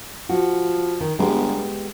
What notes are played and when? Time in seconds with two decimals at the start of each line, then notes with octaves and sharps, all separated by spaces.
0.29 F3 F#4
1.00 D#3
1.19 G1 G#3 B3 G4